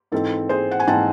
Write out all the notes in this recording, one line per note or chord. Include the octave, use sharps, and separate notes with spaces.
G#2 E3 C4 D#4 A4
G#4 C5
F#5
G#5
G#2 E3 C4 D#4 F#5 A5